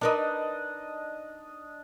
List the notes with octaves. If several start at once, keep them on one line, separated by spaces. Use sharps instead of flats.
D4 D#4 A#4 B4 D#5